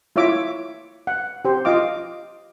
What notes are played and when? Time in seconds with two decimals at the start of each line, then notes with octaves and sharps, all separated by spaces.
0.16 E4 F4 C#5 E5 D6
1.07 F#5
1.45 G4 C5
1.65 F4 D#5 F5 D6